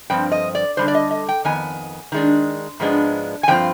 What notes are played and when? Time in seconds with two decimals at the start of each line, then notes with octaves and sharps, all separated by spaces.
0.10 G2 F3 C4 G5
0.32 D#5
0.55 D5
0.77 D3 G3 D4 C5
0.88 D5
0.95 D#5
1.11 D#5
1.29 G5
1.45 F2 D#3 B3 G#5
2.12 D#3 G#3 D4
2.80 G#2 F3 G#3 B3 D4
3.43 G#5
3.48 G2 F3 C4 F4 G5